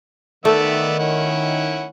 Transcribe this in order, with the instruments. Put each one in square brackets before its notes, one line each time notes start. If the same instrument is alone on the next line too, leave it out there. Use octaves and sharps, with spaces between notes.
[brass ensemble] D#3 [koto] A3 [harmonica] B3 D5 E5
[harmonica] C#4 E4 F#5